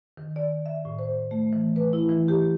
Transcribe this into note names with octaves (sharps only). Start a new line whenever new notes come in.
D#3
D5
E5
A2
C5
A3
E3
B4
E4
E3
G4